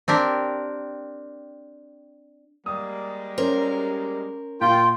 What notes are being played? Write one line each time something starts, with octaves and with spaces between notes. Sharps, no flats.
C4 D4 G4 A#4
G3 G#3 A#3 D#6
C#4 A#4 C5
A#2 F4 G5